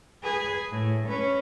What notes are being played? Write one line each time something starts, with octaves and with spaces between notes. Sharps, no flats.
G#4 B4
A2
C#4 B4